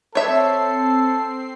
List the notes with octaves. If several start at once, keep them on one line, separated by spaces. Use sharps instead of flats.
C4 A4 C#5 E5 C7